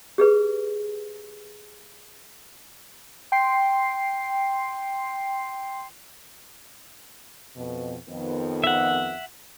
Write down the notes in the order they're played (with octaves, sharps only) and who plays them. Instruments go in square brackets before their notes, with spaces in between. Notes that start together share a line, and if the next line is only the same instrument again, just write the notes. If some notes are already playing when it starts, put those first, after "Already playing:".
[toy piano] G4 G#4 B4
[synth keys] G5 C6 C7
[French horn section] F2 B2
F2 D#3 B3
[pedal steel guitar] E5 F#5